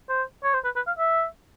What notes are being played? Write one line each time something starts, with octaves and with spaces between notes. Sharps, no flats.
C5
C#5
C5
B4
B4
F5
E5